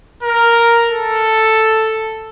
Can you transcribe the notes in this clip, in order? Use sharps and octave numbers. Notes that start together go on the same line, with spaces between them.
A#4
A4